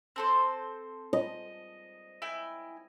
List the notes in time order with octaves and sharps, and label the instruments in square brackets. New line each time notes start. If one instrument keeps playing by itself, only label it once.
[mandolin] C4 A4 C5
[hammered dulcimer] D#5
[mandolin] E4 G5 G#5